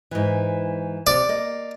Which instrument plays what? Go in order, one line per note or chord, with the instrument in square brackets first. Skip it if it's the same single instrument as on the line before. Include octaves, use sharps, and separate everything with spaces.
[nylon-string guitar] G#2 E3
[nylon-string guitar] C3 [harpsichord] D5
[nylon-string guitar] A#3 D#5